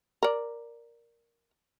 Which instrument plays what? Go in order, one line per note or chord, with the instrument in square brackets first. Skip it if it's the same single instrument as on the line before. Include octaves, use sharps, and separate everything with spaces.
[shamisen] A#4 D5